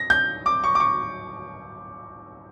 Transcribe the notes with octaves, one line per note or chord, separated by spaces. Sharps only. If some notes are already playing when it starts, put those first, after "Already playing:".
Already playing: A#6
G6
D6
C#6
D6
C#6